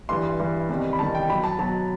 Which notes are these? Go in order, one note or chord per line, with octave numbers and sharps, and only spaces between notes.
G2 E3 G3 C6
G2 E3 G3
E2 C3 D#3 G3
B5
E2 C3 D#3 G3 A5
G5
B2 F#3 B5
A5
B2 F#3 A5